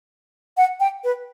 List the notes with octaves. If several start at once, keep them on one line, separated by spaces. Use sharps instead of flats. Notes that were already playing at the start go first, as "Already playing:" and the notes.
F#5
G5
B4